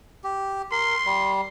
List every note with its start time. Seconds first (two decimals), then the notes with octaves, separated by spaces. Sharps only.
0.24 G4
0.72 A#4 C6
1.06 G3